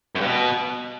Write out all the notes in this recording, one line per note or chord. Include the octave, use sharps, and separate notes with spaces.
F#2
G2
B2